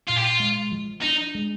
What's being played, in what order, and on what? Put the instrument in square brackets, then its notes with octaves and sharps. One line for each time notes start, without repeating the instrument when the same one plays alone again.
[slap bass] A#2 [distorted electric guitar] F4
[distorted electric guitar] G4
F4
[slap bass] G#3
F3
[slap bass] D4 [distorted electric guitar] D#4
[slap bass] G#3